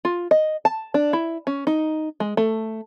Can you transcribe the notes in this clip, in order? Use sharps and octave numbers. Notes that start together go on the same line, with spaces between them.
F4
D#5
A5
D4
E4
C#4
D#4
G#3
A3